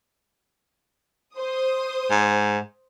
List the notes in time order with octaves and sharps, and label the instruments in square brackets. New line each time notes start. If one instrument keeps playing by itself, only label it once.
[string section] C5 D#6
[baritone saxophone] G#2